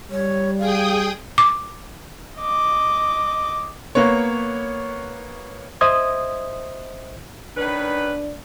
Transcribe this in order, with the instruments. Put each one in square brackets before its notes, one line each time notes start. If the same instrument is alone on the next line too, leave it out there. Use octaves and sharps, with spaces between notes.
[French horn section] G3 [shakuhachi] C#5
[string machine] G#4 G5 D#6 [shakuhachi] F5
[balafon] D6
[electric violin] D#5 D6
[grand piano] A#3 B3 C#5
[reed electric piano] C5 D#5 E5 D#6 G#6
[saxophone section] D#3 C#4 B4 [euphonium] D4